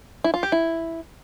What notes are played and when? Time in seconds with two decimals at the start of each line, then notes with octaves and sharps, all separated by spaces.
0.24 E4
0.34 F4
0.43 G4
0.52 E4